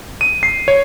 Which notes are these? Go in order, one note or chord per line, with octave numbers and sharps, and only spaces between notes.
D#7
C7
C#5